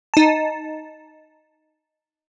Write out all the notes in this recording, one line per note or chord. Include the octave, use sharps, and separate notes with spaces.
D#4 A5